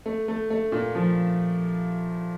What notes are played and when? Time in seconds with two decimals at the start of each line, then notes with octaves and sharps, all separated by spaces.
0.06 A3
0.28 A3
0.50 A3
0.72 A#2
0.95 F3